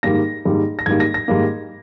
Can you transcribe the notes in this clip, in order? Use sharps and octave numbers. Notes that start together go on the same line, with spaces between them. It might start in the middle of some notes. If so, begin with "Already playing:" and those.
G#2 D#3 G3 A#3 A#6
G#2 D#3 G3 A#3
A#6
G#2 D#3 G3 A#3 G#6
A#6
A#6
G#2 D#3 G3 A#3